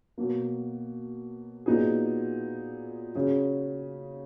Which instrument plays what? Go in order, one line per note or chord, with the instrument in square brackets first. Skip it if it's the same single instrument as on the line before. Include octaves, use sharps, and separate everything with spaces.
[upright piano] B2 F#3 A#3
A#2 F#3 B3 D#4 G#4
C#3 F#3 C#4 G#4